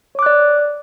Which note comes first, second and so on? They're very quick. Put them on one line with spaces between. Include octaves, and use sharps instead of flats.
C#5 D6 F#6 D5